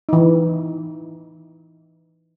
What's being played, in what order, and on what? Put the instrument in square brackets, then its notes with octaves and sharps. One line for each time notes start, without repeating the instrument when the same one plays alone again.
[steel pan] E3 D#4